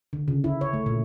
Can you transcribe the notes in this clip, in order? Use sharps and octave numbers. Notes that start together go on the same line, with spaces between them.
D3
C#3
E4
C#5
A3
A#2